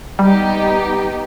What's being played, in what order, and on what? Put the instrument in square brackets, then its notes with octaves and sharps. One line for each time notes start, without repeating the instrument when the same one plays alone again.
[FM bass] G3 [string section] B3 D#4 G4